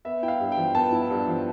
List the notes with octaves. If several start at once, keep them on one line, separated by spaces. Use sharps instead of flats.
B3 E5
E4 G5
F5
G2
G5
F3
B3 A5
E4
G2
F3